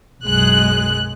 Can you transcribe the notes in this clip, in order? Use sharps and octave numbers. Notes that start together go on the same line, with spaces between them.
B1 F#2 G#3 F#6